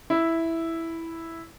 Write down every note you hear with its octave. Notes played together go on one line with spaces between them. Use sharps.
E4